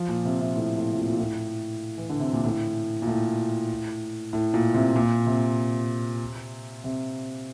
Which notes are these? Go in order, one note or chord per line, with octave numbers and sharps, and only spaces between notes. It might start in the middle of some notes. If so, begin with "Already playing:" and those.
Already playing: F3
A#2
C3
C3
A2
A2
C3
A#2
A#2
A2
E3
D3
C3
A#2
A2
A#2
A2
A2
A#2
C3
A#2
C3
C3